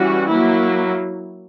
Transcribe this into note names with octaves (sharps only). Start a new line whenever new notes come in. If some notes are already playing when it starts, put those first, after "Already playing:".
Already playing: E3 G3 C#4 F#4
F#3 A#3 E4